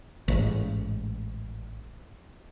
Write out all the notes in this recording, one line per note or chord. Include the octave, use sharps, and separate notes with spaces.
A1 G#2